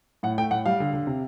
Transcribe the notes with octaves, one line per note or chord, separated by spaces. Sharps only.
A2 F#5
A3 G5
A2 F#5
G3 F5
D3
D3
C3